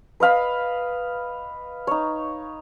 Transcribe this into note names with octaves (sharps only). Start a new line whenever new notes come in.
B4 D#5 F5 B5
D#4 C#5